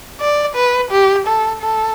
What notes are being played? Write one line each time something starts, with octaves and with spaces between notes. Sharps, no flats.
D5
B4
G4
A4
A4